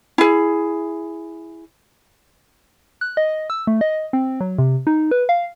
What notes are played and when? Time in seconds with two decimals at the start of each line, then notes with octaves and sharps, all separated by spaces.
0.18 E4 G#4
3.01 F#6
3.17 D#5
3.50 E6
3.67 A3
3.81 D#5
4.13 C4
4.41 F#3
4.58 C3
4.87 D#4
5.11 B4
5.29 F5